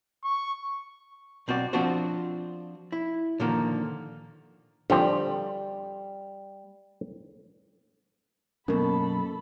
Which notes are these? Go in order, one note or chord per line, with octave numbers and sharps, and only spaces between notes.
C#6
B1 C4 F#4 D5
F3 C4 D4 F4 F#4 C5
E4
A#2 D3 D#3 F3 A#3
D3 F3 G3 C4
F#2 B2 F#3 A#3 C#4 A4 A#4 B5